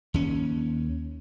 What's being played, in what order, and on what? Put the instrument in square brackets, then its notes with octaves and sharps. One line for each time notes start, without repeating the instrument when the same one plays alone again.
[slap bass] D#2 C#4